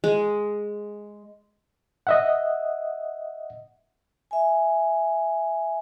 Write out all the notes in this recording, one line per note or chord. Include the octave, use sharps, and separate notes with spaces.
G#3
D#5 E5 F#5
E5 G#5